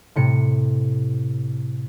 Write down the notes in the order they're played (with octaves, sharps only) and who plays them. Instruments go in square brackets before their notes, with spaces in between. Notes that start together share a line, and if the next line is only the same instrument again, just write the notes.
[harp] A2 C3 C#7